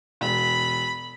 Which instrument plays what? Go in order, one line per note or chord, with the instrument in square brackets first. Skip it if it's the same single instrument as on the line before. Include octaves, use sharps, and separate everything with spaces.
[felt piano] E1 [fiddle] B5